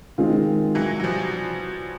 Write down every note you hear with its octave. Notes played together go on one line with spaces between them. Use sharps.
D#3 G#3 C4 F4
E3 F#3
F#3
F3 G3